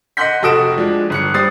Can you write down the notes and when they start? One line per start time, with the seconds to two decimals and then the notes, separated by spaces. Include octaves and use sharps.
0.17 D#5 F#5 C6 F#6 G6 B6
0.42 F1 F#4 A4 D#6 D7 E7
0.77 F3 G#3 D4
1.10 G1 F#6 C#7
1.34 G3 C5 D#6 A6 C7